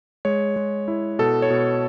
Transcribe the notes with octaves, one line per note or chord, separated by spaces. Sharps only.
G#3 C#5
G#3
E4
B2 A4
C#5
B2